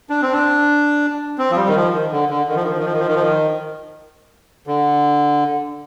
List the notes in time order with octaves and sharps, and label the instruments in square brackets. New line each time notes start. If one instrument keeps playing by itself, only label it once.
[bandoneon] D4
C4
D4
C4
F3
G3
D#3
F3
D#3
D3
D3
D#3
F3
D#3
F3
D#3
F3
D#3
F3
D#3
F3
D#3
D3